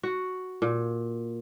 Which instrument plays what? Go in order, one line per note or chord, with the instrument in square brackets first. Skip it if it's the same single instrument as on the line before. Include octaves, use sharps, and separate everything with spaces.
[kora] F#4
A#2